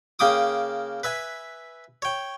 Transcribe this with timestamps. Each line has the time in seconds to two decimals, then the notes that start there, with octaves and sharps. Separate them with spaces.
0.19 C#3 A#3 G5 D6 D#6
1.03 B4 E5 G#5
2.02 C#5 G5